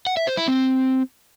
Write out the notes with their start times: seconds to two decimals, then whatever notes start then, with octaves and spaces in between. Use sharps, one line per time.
0.07 F#5
0.17 E5
0.27 C5
0.37 E4
0.48 C4